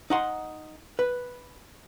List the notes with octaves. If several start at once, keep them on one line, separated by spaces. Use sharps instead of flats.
D#4 F#5 C6
B4